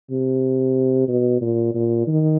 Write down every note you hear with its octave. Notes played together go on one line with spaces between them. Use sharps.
C3
B2
A#2
A#2
D#3